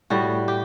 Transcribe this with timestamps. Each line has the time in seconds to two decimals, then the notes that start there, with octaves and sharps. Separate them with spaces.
0.10 A2 G3 F#4
0.48 G4